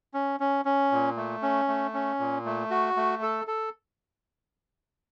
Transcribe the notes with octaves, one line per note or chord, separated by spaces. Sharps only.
C#4
C#4
C#4
A#2
A3
C#4
A3
C#4
A#2
A3
F#4
A3
A4
A4